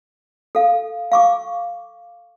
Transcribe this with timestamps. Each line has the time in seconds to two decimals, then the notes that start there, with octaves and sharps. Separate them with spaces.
0.55 A4 F5
1.12 F5 C#6 D6